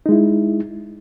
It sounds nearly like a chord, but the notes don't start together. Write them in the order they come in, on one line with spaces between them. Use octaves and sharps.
D#4 G#3 E4